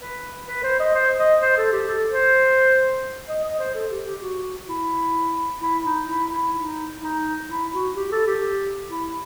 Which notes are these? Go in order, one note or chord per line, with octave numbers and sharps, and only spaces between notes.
B4
B4
C5
D#5
C5
D#5
C5
A4
G4
A4
C5
D#5
D#5
C5
A4
G4
G4
F#4
E4
E4
D#4
E4
E4
D#4
D#4
E4
F#4
G4
A4
G4
E4